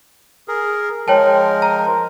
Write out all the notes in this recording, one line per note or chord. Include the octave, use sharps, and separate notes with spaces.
G#4 A#4
F3 G#3 A#4 C#5 G5 A5
A#5